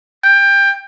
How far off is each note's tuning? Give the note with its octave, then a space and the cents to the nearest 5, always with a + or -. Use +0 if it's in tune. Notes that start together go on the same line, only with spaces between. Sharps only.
G5 +20